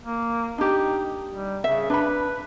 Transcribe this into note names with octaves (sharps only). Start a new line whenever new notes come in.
A#3
D4 D#4 G4
G3
C#3 E5
D4 B4 B5